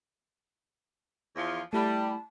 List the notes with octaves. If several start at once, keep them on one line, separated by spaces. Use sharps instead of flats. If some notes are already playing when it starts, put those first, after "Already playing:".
E2 E3 F3
G3 A3 E4 A5 B5